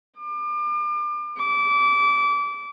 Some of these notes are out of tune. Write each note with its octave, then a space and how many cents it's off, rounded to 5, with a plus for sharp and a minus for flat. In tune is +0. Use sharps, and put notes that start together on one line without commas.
D6 +35
D6 -25